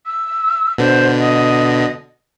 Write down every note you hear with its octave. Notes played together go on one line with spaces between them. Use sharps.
E6
B2 D3 C5
D#5